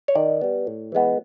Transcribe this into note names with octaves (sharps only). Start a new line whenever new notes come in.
C#5
D#3 D5
G3 B3
A2
E3 G#3 B3